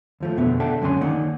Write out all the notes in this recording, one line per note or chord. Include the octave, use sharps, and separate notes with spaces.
D#2 F3 A3
F2 B2 D3 B3 E5
D4 A4 E5 F#5 G5 A5
C#2 F#2 D3 C#4 G#5 C6
D#3 A#3 D#4 D5 F#5